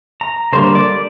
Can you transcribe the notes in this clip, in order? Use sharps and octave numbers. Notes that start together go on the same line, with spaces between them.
A#5
D3 G3 A#3 C5
D5